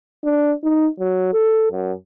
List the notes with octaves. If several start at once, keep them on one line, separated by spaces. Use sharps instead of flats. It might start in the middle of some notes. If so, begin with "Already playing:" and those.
D4
D#4
F#3
A4
F#2